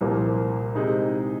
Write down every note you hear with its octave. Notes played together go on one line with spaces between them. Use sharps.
C2 A#2 F3 A#3
C3 G#3 D#4